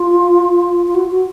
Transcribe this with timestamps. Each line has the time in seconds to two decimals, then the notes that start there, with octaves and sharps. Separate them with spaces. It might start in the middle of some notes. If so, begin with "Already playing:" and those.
Already playing: F4
0.87 F4
0.95 F#4
1.10 F#4